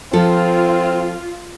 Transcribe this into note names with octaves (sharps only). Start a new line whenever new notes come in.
F3 C4 F4 A4